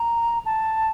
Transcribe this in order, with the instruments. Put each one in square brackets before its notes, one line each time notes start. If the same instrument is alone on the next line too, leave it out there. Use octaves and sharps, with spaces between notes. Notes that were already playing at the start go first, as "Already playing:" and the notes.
Already playing: [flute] A#5
A5